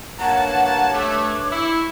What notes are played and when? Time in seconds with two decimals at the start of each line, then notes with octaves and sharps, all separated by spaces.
0.20 G2 A#3 C#5 F#5 A5 F#6
0.93 A3 D6
1.52 E4 C#6